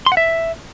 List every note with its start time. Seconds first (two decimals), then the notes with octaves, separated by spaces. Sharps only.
0.06 C6
0.12 F#5
0.17 E5